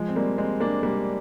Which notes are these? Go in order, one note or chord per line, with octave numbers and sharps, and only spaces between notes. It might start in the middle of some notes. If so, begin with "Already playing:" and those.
Already playing: F3 G#3
C4
G3 A#3
G#3 C4
A#3 D4
G3 A#3